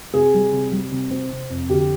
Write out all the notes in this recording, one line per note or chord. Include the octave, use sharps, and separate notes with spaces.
C3 G#4
G3
C3
G3
C3
C4
C3
F2
D3 G4